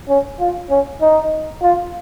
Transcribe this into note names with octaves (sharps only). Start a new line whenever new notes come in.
C#4
F4
C#4
D#4
F4